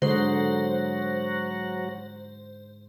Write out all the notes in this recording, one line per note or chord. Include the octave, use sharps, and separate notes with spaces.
G#2 D3 F#3 F#4 C5